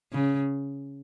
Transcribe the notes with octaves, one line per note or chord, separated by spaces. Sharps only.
C#3